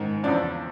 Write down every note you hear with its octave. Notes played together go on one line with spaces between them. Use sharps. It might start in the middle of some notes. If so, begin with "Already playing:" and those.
Already playing: G#2 D#3
E2 C#3 F3 D4